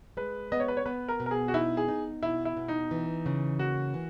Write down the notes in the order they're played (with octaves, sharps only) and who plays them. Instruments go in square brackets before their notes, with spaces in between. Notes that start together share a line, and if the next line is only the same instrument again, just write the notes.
[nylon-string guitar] G#3 [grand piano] B4
[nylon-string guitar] B3 [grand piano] D#5
[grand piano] C#5
B4
C#5
[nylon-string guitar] B3 [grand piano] B4
[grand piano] A#4
[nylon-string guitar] B2
[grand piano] A#4
G#4
F#4
[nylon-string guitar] D#4 [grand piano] E4
[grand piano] G#4
[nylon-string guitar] D#4
[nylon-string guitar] B2 [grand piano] E4
[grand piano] E4
[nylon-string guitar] B2
[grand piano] D#4
[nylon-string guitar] E3
C#3
[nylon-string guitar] A#3 [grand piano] F#4
[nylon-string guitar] E3